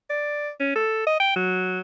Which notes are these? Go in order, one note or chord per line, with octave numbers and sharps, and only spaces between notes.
D5
C#4
A4
D#5
G5
F#3